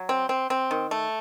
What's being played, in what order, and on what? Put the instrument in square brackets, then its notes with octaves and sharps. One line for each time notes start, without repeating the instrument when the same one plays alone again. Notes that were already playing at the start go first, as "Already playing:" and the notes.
Already playing: [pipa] F#3
C4
C4
C4
D#3
A3